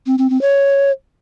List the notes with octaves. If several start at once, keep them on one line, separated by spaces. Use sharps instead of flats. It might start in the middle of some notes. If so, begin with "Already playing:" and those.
C4
C4
C4
C#5